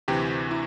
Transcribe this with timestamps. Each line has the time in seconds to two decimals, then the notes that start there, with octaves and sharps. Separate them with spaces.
0.08 D2 C3 E3 G4
0.51 E4